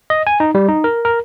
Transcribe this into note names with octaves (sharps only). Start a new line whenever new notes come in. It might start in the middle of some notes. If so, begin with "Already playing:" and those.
D#5
G#5
D#4
G3
D#4
A#4
A#4